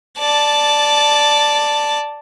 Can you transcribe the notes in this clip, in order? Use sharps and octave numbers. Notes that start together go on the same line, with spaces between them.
D5 A5